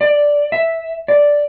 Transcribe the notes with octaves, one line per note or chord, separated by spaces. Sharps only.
D5
E5
D5